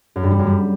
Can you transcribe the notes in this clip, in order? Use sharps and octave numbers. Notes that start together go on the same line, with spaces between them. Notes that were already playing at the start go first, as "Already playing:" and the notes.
F#2
G2
G3
F#2
G3